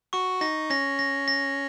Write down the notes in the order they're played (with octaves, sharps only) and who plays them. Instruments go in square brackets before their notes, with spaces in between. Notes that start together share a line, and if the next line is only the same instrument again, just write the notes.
[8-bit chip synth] F#4 [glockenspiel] C#6
[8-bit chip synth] D#4 [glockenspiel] A#6
[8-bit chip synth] C#4 [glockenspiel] A#6
[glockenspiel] A#6
A#6